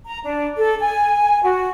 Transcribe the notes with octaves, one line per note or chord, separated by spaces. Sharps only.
A#5
D4
A4
G#5
F#4